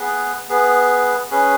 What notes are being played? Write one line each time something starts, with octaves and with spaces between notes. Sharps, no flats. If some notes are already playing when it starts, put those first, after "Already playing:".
Already playing: B3 G#4 B4
B3 G#4 B4
C#4 G#4 B4